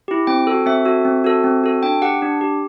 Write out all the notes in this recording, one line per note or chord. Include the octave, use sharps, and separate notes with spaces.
E4 G4
C4 G5
F#4 A4
C4 E5
F#4 A4
C4
F#4 A4
C4
F#4 A4
D4 G5
G4 F#5
D4
G4